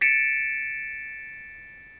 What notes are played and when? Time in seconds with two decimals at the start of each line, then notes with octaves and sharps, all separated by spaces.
0.01 A6 B6 C#7 D7 E7